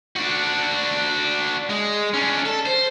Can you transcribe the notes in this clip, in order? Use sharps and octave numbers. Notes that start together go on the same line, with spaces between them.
D4 F#4
G#3
C#4 D4
A4
C5